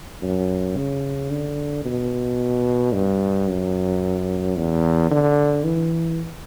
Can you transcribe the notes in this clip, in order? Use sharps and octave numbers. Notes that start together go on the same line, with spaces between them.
F#2
C#3
D3
B2
G2
F#2
E2
D3
E3